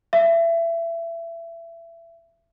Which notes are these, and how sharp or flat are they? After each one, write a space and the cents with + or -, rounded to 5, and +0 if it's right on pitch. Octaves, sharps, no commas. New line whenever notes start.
E5 +25